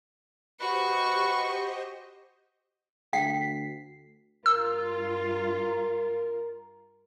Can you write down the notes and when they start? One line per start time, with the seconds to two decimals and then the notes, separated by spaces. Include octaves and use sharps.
0.60 F#4 G4 B4 C5 D#5 C#6
3.13 D2 G5 B6 C7
4.46 G2 F4 A#4 E6